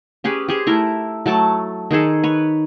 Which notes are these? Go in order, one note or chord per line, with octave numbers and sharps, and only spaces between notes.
C#4 G4 G#4 B4
G4 G#4 C5
A3 E4 A#4
F#3 A3 A5 D6
D#3 D#4 G#4 A4
B4 C#5